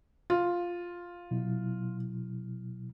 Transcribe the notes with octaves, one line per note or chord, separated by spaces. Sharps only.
F4
B2 F#3 E4